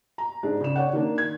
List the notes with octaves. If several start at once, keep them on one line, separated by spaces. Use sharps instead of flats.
A#5
G#2 D4
C#3 D5 E7
C#5 D5 F#5
D#3 A#3 D4
G#6